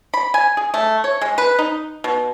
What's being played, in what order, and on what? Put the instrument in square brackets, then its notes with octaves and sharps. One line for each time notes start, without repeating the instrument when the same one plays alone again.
[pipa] B5
G#5
G#4
A3
C#5
G#3
B4
D#4
B2